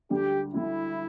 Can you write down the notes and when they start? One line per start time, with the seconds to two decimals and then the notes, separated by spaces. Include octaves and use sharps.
0.10 D2 D3 G3 G4
0.54 D2 D3 G3 E4